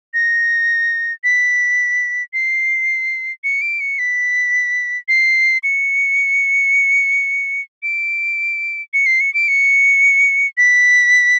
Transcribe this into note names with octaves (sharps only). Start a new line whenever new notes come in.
A#6
B6
C7
C#7
D7
C#7
B6
C7
C#7
D7
C#7
C7
C#7
D7
C#7
B6